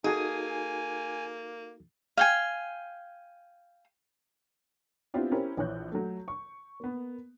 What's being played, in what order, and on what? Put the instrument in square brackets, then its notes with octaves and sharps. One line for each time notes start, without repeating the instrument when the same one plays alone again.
[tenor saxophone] A#3 [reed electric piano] D#4 F#4 A4 [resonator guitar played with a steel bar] G#4 [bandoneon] G#5
[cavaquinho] F5 G5 G#5
[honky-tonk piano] B3 C4 D4 E4 F4 G4
C#4 E4 G4 A#4 C5
A#1 E3 C#5 F#6 G6
F#3 A3
C#6
A#3 B3